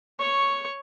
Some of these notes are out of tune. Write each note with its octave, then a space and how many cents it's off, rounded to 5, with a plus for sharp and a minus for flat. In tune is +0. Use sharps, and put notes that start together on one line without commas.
C#5 +0 C#6 +0